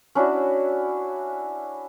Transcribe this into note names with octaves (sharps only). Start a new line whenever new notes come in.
C#4 D4 E4 F#4